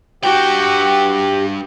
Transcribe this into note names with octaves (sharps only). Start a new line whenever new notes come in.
G2 F#4 G4 G5